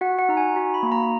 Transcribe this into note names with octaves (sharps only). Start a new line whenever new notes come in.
F#4 F#5
F#5
D#4 A#5
G#5
F#4 A#5
B5
A#3
A#5